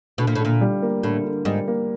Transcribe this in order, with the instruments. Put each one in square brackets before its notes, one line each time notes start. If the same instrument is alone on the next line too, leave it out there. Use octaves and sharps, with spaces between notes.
[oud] B2 [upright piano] D3
[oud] A#2
A2
[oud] A#2 [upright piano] D3
[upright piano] G3
A#3
[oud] A2 [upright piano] D3
[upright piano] D3
[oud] G#2 [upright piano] G3
[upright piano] A#3